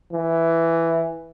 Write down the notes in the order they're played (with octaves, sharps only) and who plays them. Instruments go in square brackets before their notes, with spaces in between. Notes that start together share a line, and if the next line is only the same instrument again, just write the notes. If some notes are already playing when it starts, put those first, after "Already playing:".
[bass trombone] E3